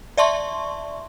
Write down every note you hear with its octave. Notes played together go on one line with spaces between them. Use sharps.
D5 E5 A5 C6 C#6